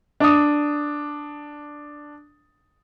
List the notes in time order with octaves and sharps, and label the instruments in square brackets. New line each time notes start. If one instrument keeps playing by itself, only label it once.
[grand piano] D4 D#6